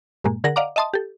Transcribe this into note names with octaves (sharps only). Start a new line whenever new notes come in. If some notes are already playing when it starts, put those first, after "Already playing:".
G2 A#2 G#3 A#3
D3 G#4 A#4 F#5 A#6
D5 D#5 F5 F#5 A#5 D6
D#5 E5 A5 C6 D#6
G4 A4